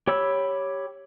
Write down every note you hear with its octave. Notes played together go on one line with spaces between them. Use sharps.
G4 C#5 B5 E6